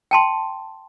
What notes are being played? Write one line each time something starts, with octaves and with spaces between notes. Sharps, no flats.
G5 A5 C6